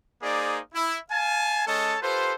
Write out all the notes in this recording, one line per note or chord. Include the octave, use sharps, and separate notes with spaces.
A#3 D#4 G#4 C5 D5
E4
F5 G#5 A5
G#3 C#4 A4 C#5 D#5 A5
F4 G4 A4 B4 C5